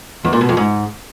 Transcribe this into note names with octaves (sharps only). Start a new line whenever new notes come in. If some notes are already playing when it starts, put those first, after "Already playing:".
E2
A#2
B2
F2
G#2